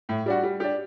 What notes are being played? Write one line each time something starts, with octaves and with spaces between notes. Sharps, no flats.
A2
G3 D4 F#4
G3
D4 G4